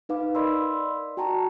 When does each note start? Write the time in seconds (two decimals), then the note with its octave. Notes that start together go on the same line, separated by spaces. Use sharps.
0.09 D#4 B4 F5 D6
0.35 A#4 D5 D#5 B5 C6 E6
1.17 F#4 G5 A5 A#5 C#6